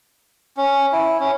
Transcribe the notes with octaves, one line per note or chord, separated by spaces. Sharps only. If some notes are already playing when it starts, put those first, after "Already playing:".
C#4
E4
C#4